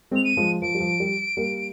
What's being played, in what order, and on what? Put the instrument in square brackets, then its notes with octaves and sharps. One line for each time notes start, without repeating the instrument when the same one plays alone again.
[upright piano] G#3 C4 [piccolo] F7
[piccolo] D#7
[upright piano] F3 G#3
[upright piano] F3 [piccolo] D7
[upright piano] G3
F3
G3
G3 A#3